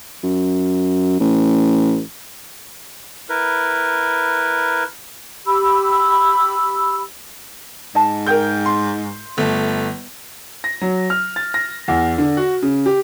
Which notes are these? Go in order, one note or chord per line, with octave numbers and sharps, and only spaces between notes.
F#2
A1
E4 A#4 B4
G4 B5 E6
G#2 D#5 A5
G#4 A#4 G5 G6
C6
G1 A3
A#6
F#3
F6
A6
A#6
E2
D3
F#4
C#3
G4